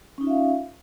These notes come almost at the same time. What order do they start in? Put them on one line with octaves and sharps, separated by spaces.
C#4 D#4 F4 E5 F5